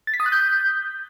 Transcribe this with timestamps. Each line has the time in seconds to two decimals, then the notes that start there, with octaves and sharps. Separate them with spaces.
0.07 A6
0.14 B6
0.20 D#6
0.26 F#6
0.32 G6